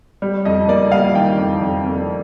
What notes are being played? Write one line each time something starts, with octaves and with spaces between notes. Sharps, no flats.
G3
F2 D#5
A#3 D5
G3 F5
D#3 G5
F2
F2
F2